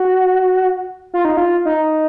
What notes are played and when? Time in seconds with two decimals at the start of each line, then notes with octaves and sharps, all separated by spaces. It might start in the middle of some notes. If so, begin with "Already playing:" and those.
Already playing: F#4
1.14 F4
1.25 D#4
1.37 F4
1.65 D#4